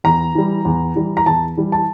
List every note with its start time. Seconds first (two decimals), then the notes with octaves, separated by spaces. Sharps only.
0.04 E2 A#5
0.35 E3 G3
0.65 E2
0.96 E3 G3
1.17 A#5
1.26 E2 A5
1.57 E3 G3
1.72 A5